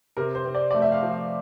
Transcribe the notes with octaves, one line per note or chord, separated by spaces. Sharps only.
C3 A#4
C5
C4
D5
A3 D5
E5
F5
F3
F5